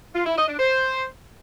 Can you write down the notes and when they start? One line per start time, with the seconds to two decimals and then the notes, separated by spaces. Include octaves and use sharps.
0.14 F4
0.25 E4
0.37 D#5
0.48 D4
0.59 C5